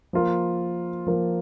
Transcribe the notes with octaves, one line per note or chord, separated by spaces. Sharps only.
F3 A#3 F4 A#4
F3 A#3 F4 A#4